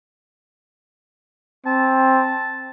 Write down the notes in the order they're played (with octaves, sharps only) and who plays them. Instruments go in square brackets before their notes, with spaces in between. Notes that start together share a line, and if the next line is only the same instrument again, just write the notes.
[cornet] C4 [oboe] A5